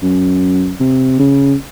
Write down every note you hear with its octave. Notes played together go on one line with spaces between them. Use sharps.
F#2
C3
C#3